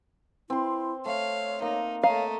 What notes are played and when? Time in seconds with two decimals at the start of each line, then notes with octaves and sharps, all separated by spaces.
0.50 C4 E4 C6
1.06 A3 C#5 F5
1.62 A#3 D#4
2.03 A3 C#5 D#5 F5 A#5